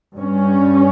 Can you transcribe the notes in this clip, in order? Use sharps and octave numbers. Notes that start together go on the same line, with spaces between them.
G2 G3 C#4